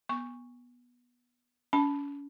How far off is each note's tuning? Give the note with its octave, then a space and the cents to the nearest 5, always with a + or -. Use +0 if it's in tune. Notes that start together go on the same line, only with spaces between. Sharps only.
B3 -20 C#6 +0
C#4 +35 A5 -10